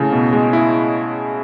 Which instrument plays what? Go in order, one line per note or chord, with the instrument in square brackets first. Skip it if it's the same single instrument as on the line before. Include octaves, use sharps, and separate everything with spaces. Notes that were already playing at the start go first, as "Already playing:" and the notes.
Already playing: [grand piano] A2 A3 [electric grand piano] C#3
[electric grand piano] B2
G#3
E4